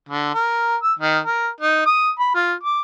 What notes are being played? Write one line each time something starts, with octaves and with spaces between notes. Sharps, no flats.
D3
A#4
E6
D#3
A#4
D#4
D#6
B5
F4
D6